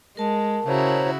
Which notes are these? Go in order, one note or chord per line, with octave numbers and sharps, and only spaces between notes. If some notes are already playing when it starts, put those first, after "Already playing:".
G#3 A#4 A5
C#3 E4 F#4 C5 C#5 A#5